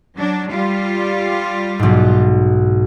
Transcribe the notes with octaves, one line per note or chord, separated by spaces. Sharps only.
F#3 D4
G3 F4
B1 G#2